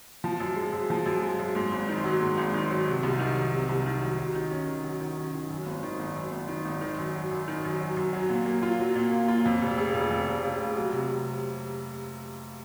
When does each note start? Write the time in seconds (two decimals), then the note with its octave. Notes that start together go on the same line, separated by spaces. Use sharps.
0.24 F3
0.40 F#2
0.56 G#3
0.73 F#2
0.90 F3
1.06 F#2
1.22 G#3
1.39 F#2
1.55 G#2
1.72 G#1
1.89 D#3
2.04 F#3
2.21 G#2
2.37 G#1
2.54 D#3
2.71 F#3
2.87 C3
3.03 C2
3.19 D#3
3.37 F#3
3.52 C3
3.69 C2
3.86 D#3
4.02 F#3
4.18 F#3
4.35 D#3
4.51 C#4
4.67 D#3
4.84 F#3
5.01 D#3
5.17 C#4
5.34 D#3
5.50 F#2
5.66 G#1
5.83 D#3
5.99 G#1
6.16 F#2
6.32 G#1
6.48 D#3
6.65 G#1
6.81 D#3
6.98 F#2
7.15 F#3
7.31 F#2
7.48 D#3
7.65 F#2
7.81 F#3
7.96 F#2
8.13 F#3
8.29 A#2
8.46 A#3
8.63 F4
8.80 F#3
8.95 A#2
9.12 A#3
9.28 F4
9.46 F2
9.62 F1
9.78 C#3
9.94 F1
10.10 F2
10.28 F1
10.44 C#3
10.60 F1
10.77 F#3
10.93 C3